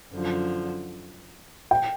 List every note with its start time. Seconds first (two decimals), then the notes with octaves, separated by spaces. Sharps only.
0.12 F#2 D3 F3
1.71 G5